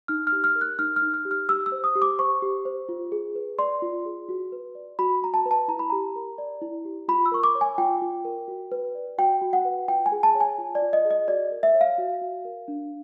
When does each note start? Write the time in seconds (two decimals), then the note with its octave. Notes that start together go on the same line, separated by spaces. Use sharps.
0.08 D#4 F6
0.27 F6
0.32 G4
0.44 F6
0.55 A#4
0.61 F#6
0.79 D#4 F6
0.96 F6
1.02 D#4
1.14 F6
1.25 G4
1.31 F6
1.49 G4 E6
1.66 E6
1.72 C5
1.84 D#6
1.96 G4
2.02 D6
2.19 C5 C#6
2.42 G4
2.65 C5
2.89 F4
3.12 G#4
3.35 B4
3.59 D5 C6
3.82 F4
4.05 G#4
4.29 F#4
4.52 B4
4.75 D5
4.99 F#4 B5
5.22 F#4 A#5
5.34 A5
5.45 B4
5.51 A5
5.68 E4 A#5
5.79 B5
5.90 G4 A#5
6.16 A#4
6.38 D5
6.62 E4
6.85 G4
7.08 F4 B5
7.26 E6
7.32 A#4 C#6
7.44 D6
7.55 C#5
7.61 G#5
7.78 F4 G5
8.02 F4
8.25 A#4
8.48 F#4
8.72 B4
8.95 D5
9.18 F#4 G5
9.42 F#4
9.53 F#5
9.65 B4
9.88 F4 G5
10.06 G#5
10.12 G#4
10.23 A5
10.35 C#5
10.40 G#5
10.58 F4
10.75 D5
10.82 F4
10.93 D#5
11.05 G#4
11.11 D#5
11.28 F#4 D5
11.51 A#4
11.63 E5
11.75 C#5
11.81 F5
11.98 F#4
12.21 F#4
12.45 A#4
12.68 D4